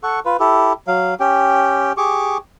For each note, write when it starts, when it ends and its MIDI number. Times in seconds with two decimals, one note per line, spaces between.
0.03 0.20 69
0.03 0.20 78
0.03 0.20 85
0.25 0.37 65
0.25 0.37 71
0.40 0.73 64
0.40 0.73 67
0.40 0.73 69
0.88 1.14 54
0.88 1.14 77
1.20 1.92 61
1.20 1.92 67
1.20 1.92 79
1.97 2.38 67
1.97 2.38 68
1.97 2.38 85
1.97 2.38 86